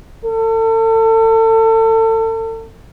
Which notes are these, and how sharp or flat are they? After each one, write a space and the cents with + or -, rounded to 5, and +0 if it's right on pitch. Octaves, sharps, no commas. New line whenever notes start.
A4 +35